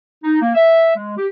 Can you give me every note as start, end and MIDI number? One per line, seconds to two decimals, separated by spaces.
0.24 0.40 63
0.41 0.54 58
0.55 0.94 76
0.96 1.12 56
1.17 1.27 67